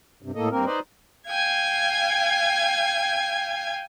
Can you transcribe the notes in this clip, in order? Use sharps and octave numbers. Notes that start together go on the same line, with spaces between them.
G2 C3
A2 A#3 A4 D#5
G2 A#3 C4 A#4
D#4 B4 C5 D5 D#5
F5 G5 G#5 G#6